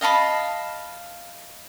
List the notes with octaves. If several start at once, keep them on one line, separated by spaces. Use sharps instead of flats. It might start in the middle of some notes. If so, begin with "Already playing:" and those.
D#5 F5 A5 B5